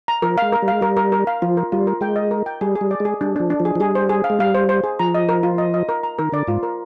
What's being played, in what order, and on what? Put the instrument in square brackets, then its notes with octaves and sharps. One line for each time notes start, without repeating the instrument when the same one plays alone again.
[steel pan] A#5
[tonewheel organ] F3 [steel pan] A#4
[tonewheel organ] G#3 [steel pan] F5
[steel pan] A#4
[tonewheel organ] G3
[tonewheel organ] G#3 [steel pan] F5
[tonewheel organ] G3 [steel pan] A#4
[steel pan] A#4
A#4
F5
[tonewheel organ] F3 [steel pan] F4
[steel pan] A#4
[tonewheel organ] G3 [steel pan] F4
[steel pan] A#4
[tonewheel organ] G#3 [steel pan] G5
[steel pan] D#5
A#4
G5
[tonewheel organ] G3 [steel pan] G#4
[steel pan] G#4
[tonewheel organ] G3
[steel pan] D5
[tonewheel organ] G#3 [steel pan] G#4
[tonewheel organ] G3 [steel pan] D4
[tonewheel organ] F3 [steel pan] D4
[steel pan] D4
[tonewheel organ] F3
[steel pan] G#4
[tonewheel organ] F3
[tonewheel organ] G3 [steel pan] G#4
[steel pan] C5
G#4
F5
[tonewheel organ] G#3
[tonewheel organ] G3 [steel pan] F5
[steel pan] C5
C5
G#4
[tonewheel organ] F3 [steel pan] A#5
[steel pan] D#5
A#4
F4
D#5
D#5
A#4
A#5
[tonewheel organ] D#3 [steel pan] A#4
[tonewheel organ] D3 [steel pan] D5
[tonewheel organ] G#2 [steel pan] F4
[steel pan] A#4